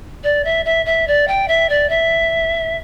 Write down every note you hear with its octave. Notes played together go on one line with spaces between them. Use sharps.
D5
E5
E5
E5
D5
G5
E5
D5
E5